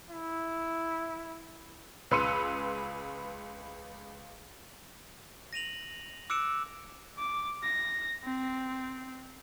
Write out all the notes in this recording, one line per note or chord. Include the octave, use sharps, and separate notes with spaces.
E4
C#2 B4 C6 E6 C#7 D#7
A#6 D#7 F7 F#7
D6 E6 F#6 C#7 D7 E7
D6
A#6
C4